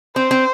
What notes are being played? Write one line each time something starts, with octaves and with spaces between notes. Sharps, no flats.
C4 C5
C4